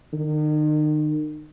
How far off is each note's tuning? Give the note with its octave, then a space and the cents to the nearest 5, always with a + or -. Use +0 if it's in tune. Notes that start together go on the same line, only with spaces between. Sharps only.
D#3 -35